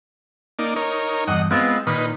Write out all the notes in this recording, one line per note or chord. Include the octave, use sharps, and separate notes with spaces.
A#3 D#4 D5
D#4 A#4 C#5
E2 G2 D#5 F#5
G#3 B3 C4 F4
A#2 D#3 D#4 B4